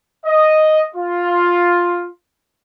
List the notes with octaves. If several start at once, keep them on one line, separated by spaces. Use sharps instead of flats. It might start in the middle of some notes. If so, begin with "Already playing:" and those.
D#5
F4